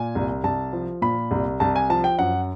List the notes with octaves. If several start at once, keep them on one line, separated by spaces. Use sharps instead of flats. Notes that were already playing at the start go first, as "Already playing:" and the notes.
Already playing: A#2 G#5
C2
C2 A5
F3
A#2 B5
C2
C2 A5
G#5
F3 A5
G5
F#2 F#5